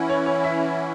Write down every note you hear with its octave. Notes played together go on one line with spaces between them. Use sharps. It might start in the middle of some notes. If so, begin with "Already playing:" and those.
Already playing: E3 C#4 E4 F#5
C#5
C#5
E5